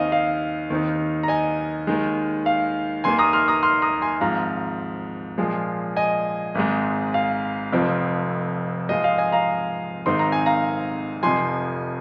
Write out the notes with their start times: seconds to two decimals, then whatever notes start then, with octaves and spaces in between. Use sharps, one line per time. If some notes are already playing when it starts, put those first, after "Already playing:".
Already playing: D#2 D#3 C4 D#4 D#5 F5 G#5
0.12 F5
0.70 D#2 D#3 C4 D#4
1.23 A#5
1.28 D#5 G#5
1.87 D#2 D#3 G#3
2.46 F5
3.04 D#2 D#3 A#3 G#5 C6
3.19 A#5 D#6
3.33 C6 F6
3.48 A#5 D#6
3.63 C6 F6
3.82 A#5 D#6
4.02 G#5 C6
4.21 G#1 G#2 F3 F5 A#5
5.38 A#2 F3 G#3 F4
5.97 D#5 G#5
6.55 G#1 G#2 G#3
7.14 F5
7.72 F1 F2 F3 C4 F4
8.89 G#2 F3 G#3 F4 D#5
9.04 F5
9.18 D#5 G#5
9.32 F5 A#5
10.06 G#1 G#2 D#3 C4 D#4 C6
10.19 A#5
10.32 G#5
10.46 F5 A#5
11.23 F1 F2 F3 G#5 C6